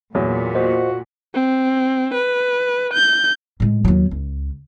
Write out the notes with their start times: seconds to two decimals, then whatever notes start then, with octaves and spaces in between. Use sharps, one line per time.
0.15 E2 A#2 F#3
0.55 F4 F#4 C5 D#5 F#5
1.34 C4
2.14 B4
2.93 G6
3.60 A2 G#3
3.85 D#2 F#3
4.11 C#2